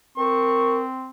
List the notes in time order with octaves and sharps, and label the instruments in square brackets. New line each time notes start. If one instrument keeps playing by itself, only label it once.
[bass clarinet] C4 [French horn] A#4 [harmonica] C#6